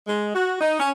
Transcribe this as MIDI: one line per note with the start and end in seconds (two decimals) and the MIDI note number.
0.07 0.34 56
0.35 0.56 66
0.61 0.77 63
0.79 0.89 61